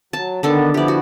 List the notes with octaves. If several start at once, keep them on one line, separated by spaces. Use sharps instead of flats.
F#3 A5
D3 D#3 B3 D4 A4
F3 B3 E4 G4 D5
F#4